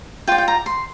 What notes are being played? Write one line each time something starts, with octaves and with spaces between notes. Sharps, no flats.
F4 D5 G5
G5
A#5
C6